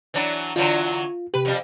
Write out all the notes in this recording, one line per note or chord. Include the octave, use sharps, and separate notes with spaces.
E3 F#3 D4
D3 E3 F#3 F4
C3 G4 B4
F2 G3